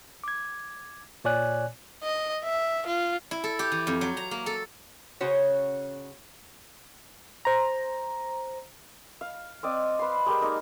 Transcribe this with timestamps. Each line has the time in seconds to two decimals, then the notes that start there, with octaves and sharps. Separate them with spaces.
0.24 D6 G#6
1.25 A#2 C#5 D5 G#5 F#6
2.03 D#5
2.44 E5
2.87 F4
3.31 E4
3.44 A4
3.59 G4
3.72 E3
3.87 F2
4.01 F#3
4.17 A#5
4.31 A#3
4.46 A4
5.20 C#3 C#4 F#4 C5 C#5
7.45 C5 A#5
9.21 F5
9.63 C4 D5 D#5
9.99 B4 C6
10.26 G#3 G4 A#4
10.41 A#3 D#4 D5